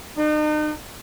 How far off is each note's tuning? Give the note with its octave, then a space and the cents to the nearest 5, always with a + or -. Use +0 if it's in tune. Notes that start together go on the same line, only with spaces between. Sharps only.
D#4 -40